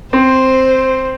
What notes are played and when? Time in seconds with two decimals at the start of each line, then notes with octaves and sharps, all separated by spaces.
0.13 C4 C5